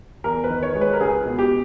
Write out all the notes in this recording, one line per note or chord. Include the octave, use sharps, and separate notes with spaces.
E2 A#4
B4
D#3
C#5
G#3
B4
A#4
C#2 G#4
B2
G4